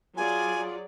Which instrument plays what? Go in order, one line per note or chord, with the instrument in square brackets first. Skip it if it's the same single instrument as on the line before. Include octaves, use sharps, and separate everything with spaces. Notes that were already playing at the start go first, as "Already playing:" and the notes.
[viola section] F#3 G#4 D5 [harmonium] F4 [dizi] G#5